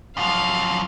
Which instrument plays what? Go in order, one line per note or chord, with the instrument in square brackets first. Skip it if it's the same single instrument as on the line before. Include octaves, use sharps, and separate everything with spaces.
[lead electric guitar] F#2 F3 [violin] F5